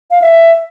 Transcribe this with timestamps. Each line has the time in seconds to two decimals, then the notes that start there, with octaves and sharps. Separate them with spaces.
0.11 F5
0.22 E5